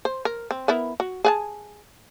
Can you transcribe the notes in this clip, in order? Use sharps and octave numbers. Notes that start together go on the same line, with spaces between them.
C5
A#4
C4
B3 E4 A#4
F#4
G#4 F#5 A5